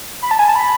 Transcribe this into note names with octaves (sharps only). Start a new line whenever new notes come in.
B5
A5
G#5
A5
B5